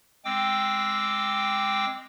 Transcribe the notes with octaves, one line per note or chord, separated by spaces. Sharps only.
G#3 C4 G5 D6 E6